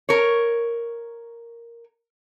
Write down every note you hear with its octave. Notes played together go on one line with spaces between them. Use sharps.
A#4 C#5